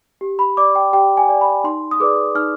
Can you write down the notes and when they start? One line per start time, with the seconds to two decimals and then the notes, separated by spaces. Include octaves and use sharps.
0.21 G4
0.39 B5
0.57 D5 D6
0.75 G5
0.93 G4 G5
1.17 G#5
1.29 D5
1.41 B5
1.64 D#4 C6
1.91 D#6
2.00 G#4 B4 D5 D6
2.35 D#4 F6